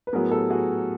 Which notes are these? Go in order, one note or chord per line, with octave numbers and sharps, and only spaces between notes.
B4
A2 F#3 B3 G#4 A#4
G4 A4
F#4 G#4